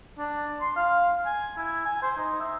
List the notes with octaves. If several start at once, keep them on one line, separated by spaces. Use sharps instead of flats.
D4
C6
F5
G#5
E4
G#5
C5
D#4
E5